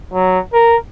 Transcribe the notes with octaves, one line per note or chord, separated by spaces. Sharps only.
F#3
A#4